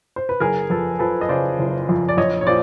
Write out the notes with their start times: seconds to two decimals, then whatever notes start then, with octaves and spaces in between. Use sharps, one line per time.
0.16 C5
0.29 B4
0.40 F#1 G#4 A#4
0.70 F2 A4 B4
0.99 F3 A4 B4
1.21 D#5
1.29 C#3 C5 D5
1.59 F#1
1.89 F2
2.09 D5
2.17 A#1 C#5 D#5
2.41 C#5
2.47 A#2 C5 D5